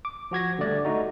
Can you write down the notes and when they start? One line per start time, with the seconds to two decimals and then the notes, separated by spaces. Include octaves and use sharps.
0.05 D6
0.31 F3 F#4 G#6 A#6
0.59 D3 G3 A3 D5
0.85 A3 D#4 F#4